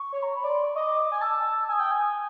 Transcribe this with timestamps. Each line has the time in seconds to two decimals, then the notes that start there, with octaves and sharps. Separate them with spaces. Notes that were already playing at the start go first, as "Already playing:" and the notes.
Already playing: C#6
0.12 C#5
0.22 A#5
0.35 B5
0.44 D5 C6
0.62 C#6
0.75 D#5 D6
1.12 G#5
1.21 A5 E6
1.68 G#5 D#6 E6
1.80 G5
1.91 G#5